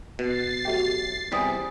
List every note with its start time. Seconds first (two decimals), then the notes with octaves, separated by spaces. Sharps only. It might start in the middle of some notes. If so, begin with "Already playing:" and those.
0.19 B2 A6 C7
0.65 F#3 A3 G4
1.32 E2 C3 G3 G#5 D#6 B6